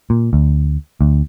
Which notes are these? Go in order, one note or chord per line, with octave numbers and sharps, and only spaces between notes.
A#2
D2
D2